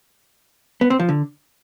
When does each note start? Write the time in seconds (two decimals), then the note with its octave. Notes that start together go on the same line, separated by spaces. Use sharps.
0.81 B3
0.90 C4
0.99 F3
1.09 D3